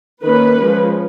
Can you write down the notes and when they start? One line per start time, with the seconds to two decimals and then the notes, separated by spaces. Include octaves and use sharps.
0.23 D#3 A#3 C#4 B4
0.59 F3 G#3 C#4